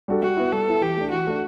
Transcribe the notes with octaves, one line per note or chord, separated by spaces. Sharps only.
G3 D4 F#4 A4
G3 F#4
B3 E4
G3 A4
B3 E4
E3 G4
A3 D4
E3 F#4
A3 D4